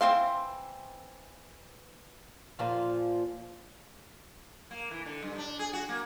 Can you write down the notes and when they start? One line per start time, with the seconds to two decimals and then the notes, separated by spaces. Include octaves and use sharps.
0.01 E3 C4 C5 F5
2.59 A#2 F3 F4
4.71 A#3
4.91 E3
5.06 D3
5.22 G2
5.38 D4
5.59 G#4
5.73 F#4
5.89 A#3